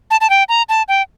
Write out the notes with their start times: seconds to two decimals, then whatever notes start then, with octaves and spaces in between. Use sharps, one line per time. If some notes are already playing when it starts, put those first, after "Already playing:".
0.11 A5
0.21 A5
0.30 G5
0.49 A#5
0.69 A5
0.88 G5